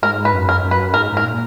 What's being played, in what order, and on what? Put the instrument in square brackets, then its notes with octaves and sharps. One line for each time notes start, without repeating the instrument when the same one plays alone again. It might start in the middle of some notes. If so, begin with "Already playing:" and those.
[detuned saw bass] G#2 [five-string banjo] A#4
[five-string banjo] B4
[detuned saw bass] F#2
[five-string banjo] A#4
[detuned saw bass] F#2
[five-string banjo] B4
[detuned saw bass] G#2 [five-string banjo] A#4
[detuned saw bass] G#2 [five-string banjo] A#4
[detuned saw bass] A#2